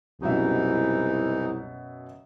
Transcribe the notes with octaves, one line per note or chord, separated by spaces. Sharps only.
C2 F#2 B2 E3 D#4 E5